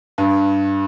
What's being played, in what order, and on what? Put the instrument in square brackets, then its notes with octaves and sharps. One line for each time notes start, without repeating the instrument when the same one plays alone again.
[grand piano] G2